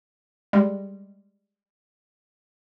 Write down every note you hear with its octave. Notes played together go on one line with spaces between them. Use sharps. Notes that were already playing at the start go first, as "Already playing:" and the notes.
G3 G#3